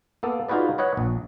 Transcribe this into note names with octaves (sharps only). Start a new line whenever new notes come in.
A#3 B3 A4
D#4 F4 F#4 G#4 B4 D5
B4 C#5 D#5 F#5
A#1